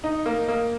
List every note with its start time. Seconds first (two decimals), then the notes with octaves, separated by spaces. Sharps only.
0.04 D#4
0.25 A#3
0.48 A#3